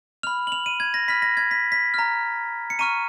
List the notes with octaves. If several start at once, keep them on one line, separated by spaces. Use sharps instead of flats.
B5 F6 F7
F#7
F7
D#7
G#6
A#6
B5 F6 B6
A#6
G#6
B6
B6
A#5 F6
C#7
A#5 C#6 F6 D#7